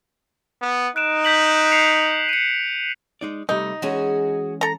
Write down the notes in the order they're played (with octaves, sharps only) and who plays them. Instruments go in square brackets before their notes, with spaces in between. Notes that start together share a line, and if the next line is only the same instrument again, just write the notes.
[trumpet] B3
[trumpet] D#4 [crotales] F#6 D7 E7
[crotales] G6 B6 F#7
C7 C#7 F7
C#7 D#7
[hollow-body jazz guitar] G#3 D#4 D5
[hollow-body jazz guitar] C3 G3 A3 [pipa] D#4
[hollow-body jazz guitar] E3 G#3 C#4 [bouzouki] F#4 G#4
[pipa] A4 A#5